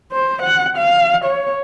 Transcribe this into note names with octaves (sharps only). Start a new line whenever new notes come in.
C5
F#5
F5
C#5